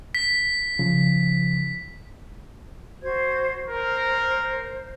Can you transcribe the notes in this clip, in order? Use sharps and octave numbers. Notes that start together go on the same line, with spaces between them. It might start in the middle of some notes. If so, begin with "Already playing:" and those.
B6
C#3 F3
F#4 C5 G#6
A#4 C5